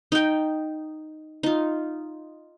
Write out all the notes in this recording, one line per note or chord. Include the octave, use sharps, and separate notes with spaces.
D#4 G5
D#4 F4